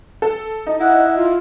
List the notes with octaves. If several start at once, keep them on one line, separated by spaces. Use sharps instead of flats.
A4
D#4
E4 F#5
F4